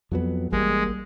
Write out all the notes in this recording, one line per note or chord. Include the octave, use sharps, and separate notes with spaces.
F2 F3 F#3 B3
A1 G3 G#3 A#3